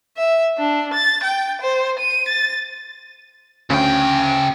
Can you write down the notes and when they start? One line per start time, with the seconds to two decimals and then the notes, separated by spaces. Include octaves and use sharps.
0.17 E5
0.58 D4
0.94 A6
1.23 G5
1.62 C5
1.99 D#7
2.29 A6
3.70 D2 C#3 C#4 G5